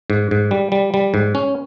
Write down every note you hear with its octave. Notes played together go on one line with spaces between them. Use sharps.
G#2
G#2
G3
G3
G3
G#2
C#4